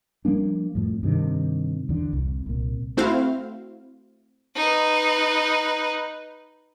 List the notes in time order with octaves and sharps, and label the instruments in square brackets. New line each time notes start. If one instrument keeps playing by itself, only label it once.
[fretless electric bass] F3 G3 A#3 D4
F2 A2
G2 C3 D#3
E2 D3
C2
C2 A#2
[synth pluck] A3 C4 E4 F#4 C5 F5
[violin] D#4 B4